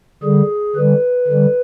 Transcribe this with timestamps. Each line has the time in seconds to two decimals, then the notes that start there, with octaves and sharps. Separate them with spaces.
0.23 D3 G3 G#4
0.76 D3 G3 B4
1.28 D3 G3